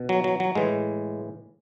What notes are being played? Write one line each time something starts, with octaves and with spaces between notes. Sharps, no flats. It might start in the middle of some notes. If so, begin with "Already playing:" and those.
Already playing: B2
F#3
F#3
F#3
A2 E3 G#3